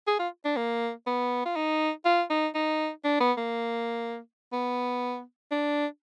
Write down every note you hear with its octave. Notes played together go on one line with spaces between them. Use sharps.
G#4
F4
D4
A#3
B3
F4
D#4
F4
D#4
D#4
D4
B3
A#3
B3
D4